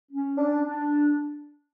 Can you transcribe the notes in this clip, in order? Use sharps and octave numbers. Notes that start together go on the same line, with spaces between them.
C#4
D4
D4